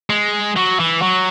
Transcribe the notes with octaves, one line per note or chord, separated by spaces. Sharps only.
G#3
F#3
E3
F#3